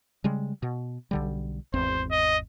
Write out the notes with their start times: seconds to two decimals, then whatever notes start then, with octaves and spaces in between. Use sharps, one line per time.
0.24 C#3 G3 G#3
0.62 B2
1.11 B1 D3 G3
1.74 G#1 E2 C4 C5
2.11 D#5